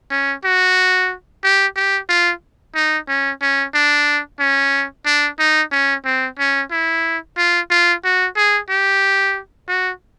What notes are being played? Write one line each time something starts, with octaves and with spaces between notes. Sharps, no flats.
C#4
F#4
G4
G4
F4
D#4
C#4
C#4
D4
C#4
D4
D#4
C#4
C4
C#4
E4
F4
F4
F#4
G#4
G4
F#4